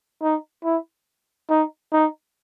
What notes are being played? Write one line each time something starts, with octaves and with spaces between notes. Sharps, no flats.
D#4
E4
D#4
D#4